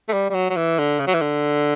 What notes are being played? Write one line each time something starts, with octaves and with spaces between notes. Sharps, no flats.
A3
G3
G3
F#3
F#3
E3
D3
C#3
F#3
E3
D3